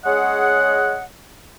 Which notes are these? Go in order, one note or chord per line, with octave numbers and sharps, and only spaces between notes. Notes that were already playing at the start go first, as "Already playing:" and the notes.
G#3 C#4 G#4 C#5 D#5 F#5